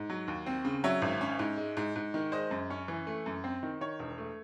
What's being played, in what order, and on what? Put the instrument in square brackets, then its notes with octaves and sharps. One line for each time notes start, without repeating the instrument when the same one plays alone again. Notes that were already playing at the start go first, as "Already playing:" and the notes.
Already playing: [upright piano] G#2
F#3
D#2
C4
C#3
F#3 C#5 E5
G#1
C#4
G#2
G#3
G#2
G#2
D#3
G#3 C5 D#5
F#2
C#4
E3
A3
F#2
C4
D#3
D#3 C#5
E1
A3